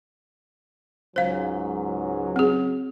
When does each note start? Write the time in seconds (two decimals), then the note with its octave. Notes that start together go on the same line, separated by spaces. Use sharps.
1.16 C#2 G#2 F#3 C5 F5
2.36 C4 G#4